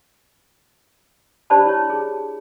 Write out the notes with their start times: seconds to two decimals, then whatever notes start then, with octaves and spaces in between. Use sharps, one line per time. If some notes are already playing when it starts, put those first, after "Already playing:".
1.50 D4 G4 C5 D5 A5 B5
1.66 E4 C#5
1.90 G#4